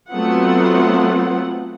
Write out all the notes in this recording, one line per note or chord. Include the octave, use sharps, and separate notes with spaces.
F#3 A3 B3 C4 F4 F#5